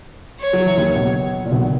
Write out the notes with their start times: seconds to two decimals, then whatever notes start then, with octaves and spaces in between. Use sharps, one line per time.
0.41 C#5
0.53 F#3
0.66 E3
0.77 D#2 D#3
0.96 B1 B2
1.45 A#2
1.52 B1 B2
1.62 D#3